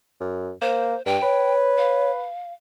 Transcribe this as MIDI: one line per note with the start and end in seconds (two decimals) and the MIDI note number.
0.21 0.51 42
0.62 0.95 58
0.62 1.02 72
1.06 1.17 43
1.06 1.53 79
1.22 2.28 71
1.22 2.11 73
1.78 2.53 77